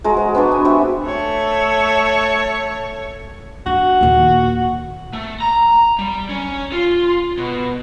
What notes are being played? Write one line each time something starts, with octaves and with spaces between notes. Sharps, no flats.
G#3 F#4 A#5
C5
B3 D4 F#4
G#5
C4 F#4 G4 E5
A3 C#5
D4 F#4
D#2 A#2
A3
A#5
G3
C#4
F4
B2